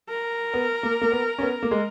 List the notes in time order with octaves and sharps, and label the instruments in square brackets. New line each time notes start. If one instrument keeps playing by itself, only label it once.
[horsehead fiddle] A#4
[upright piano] B3
A#3
A#3
B3
C#4
B3
A#3
G#3